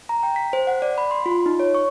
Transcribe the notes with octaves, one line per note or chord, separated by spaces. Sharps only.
A#5
G5
B6
C5
F#5
D5
B5
C6
F4
D#4
C#5
C#6